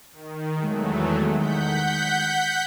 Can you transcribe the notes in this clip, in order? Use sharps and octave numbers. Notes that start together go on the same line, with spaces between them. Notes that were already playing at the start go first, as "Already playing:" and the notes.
D#3
E2 D#3 F#3 G#3 A3
F#5 G6 B6